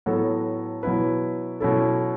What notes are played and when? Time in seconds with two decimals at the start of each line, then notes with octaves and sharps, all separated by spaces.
0.06 A2 F#3 B3 F#4 A4
0.83 B2 F#3 B3 E4 B4
1.60 B2 F#3 C#4 E4 A4